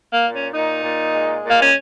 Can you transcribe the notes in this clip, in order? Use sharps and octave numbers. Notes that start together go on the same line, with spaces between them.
A#3
A#2
C#4
A#2 D#4
A#2
G#3
A#2
A#3
C#4